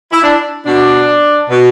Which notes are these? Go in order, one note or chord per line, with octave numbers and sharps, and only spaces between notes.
E4
D4
B2 D4
B2